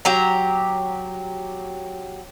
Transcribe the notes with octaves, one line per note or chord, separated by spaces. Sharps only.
F#3 G4 A#5